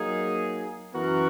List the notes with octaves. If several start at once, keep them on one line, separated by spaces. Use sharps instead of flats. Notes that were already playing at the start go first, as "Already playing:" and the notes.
Already playing: F#3 A#3 D#4 G#4
F#2 E3 B3 F#4 A#4